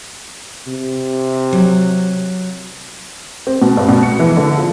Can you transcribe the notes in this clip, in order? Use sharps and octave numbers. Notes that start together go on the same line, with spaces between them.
C3
F#3
C4
B2
G2
B2
C#7
E3
D3
F3